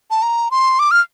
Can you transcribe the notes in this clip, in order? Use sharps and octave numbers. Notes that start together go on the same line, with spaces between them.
A5
A#5
C6
D6
F6